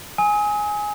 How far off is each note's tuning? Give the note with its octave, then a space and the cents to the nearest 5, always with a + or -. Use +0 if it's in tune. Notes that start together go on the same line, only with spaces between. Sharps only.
G#5 +0 D#6 +40